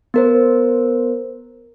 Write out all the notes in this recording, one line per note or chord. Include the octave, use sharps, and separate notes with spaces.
B3 A#4 C5